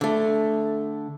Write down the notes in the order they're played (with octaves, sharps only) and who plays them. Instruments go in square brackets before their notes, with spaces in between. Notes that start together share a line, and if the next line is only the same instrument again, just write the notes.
[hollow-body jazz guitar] D3 A3